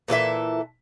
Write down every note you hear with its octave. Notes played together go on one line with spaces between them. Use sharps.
A#2 E3 A4 E5